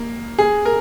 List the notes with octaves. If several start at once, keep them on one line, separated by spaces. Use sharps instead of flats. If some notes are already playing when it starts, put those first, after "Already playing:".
Already playing: A#3
G#4
A#4